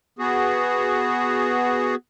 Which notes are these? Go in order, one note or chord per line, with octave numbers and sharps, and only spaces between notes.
B3 F#4 G#4